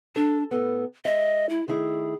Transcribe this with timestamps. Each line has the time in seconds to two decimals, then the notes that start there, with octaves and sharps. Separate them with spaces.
0.16 D4 A4
0.51 A2 B3 A4
1.05 G#3 D#5 E5
1.49 E4
1.68 D#3 A3 E4 G#4